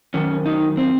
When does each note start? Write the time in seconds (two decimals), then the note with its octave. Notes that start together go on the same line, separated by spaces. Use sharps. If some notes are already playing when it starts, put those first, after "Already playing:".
0.14 F#2 D#3 C#4
0.46 D#4
0.77 C4